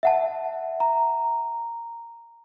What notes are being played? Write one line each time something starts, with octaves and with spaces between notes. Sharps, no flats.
E5 F#5 A5
A#5